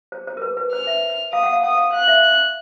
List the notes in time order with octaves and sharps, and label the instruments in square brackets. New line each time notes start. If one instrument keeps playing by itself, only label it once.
[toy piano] C5
C5
A#4
B4
B4
[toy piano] C5 [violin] F6
[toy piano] E5
[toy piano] F5 [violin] D#6
[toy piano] F#5
F5
[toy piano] F#5 [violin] D#6
[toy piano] F5
[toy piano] F5 [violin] F#6
[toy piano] E5